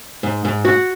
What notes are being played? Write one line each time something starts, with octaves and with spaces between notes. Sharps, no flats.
G#2
G#2
F#4